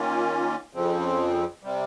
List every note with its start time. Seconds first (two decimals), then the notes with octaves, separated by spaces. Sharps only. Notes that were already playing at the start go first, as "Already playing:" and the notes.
Already playing: D#3 A#3 C#4 F4
0.73 F2 C#3 F3 C4
1.63 C3 G3